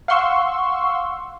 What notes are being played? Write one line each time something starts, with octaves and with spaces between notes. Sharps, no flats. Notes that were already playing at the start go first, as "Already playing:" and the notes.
F5 F#5 C6 C#6 E6